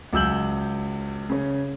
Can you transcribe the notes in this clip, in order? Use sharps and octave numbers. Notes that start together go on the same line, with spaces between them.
C#2 F#3 E6 G6 F#7
C#3 C#4